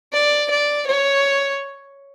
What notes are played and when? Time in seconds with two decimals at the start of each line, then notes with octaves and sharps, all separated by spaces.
0.13 D5
0.50 D5
0.87 C#5